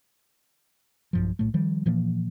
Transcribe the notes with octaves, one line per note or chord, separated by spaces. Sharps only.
B1 G2 F3
B1 A2 A3
D#3 F3 G3
A#2 E3 F3 A#3